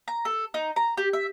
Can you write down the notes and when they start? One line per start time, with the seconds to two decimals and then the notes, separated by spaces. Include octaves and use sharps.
0.08 A#5
0.25 A4
0.54 D#4
0.76 A#5
0.97 G4
1.13 E5